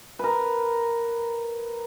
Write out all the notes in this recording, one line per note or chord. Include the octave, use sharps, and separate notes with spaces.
A#4 B4